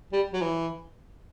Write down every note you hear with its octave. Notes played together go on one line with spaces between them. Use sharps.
G3
F#3
E3